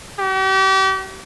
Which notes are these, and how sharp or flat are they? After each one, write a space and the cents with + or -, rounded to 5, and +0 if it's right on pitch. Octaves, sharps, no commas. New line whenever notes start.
G4 -40